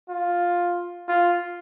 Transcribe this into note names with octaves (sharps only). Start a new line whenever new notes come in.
F4
F4